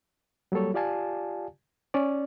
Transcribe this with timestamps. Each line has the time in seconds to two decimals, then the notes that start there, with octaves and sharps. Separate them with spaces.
0.52 F#3 G3 A#3 A4 C#5
0.74 F4 G4 D5 F5 G#5 A5
1.94 C#4 D5